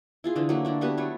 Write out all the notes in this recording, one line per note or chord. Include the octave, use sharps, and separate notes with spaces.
E4 F4 G#4
D3 E3
F#3 A3 A#3
D3 D4 E4
G3 B3 F#4 B4
F#3 A3 C#5